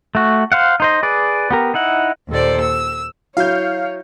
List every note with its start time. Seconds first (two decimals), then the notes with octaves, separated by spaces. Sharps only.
0.15 A3 F#4
0.52 C5 F5 F#5
0.80 D#4 C5 D#5
1.03 G#4 B4 D5
1.51 B3 G4 A#4
1.74 D#4 E4 F#5
2.29 D#2 A#2 A4 C5 D5
2.59 E6
3.37 F#3 E4 C#5 F5 G6